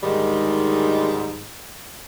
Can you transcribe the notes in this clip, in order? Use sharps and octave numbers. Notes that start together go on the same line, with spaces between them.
D2 G#2 D#3 G3 G#3